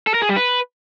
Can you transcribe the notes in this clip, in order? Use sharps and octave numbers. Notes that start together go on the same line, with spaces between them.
A4
A#4
G#4
G3
B4